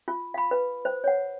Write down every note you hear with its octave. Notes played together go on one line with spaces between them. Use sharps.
F4
F5 B5
B4
C5
C#5 F#5